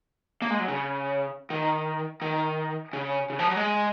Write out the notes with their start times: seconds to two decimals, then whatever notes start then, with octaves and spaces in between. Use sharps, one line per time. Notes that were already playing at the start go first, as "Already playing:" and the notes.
0.42 A#3
0.50 G#3
0.60 F#3
0.68 C#3
1.50 D#3
2.22 D#3
2.93 C#3
3.30 C#3
3.39 F3
3.48 F#3
3.56 G#3